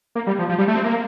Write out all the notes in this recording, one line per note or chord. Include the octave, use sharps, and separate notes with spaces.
A#3
G3
F3
F3
G3
A3
C4
A#3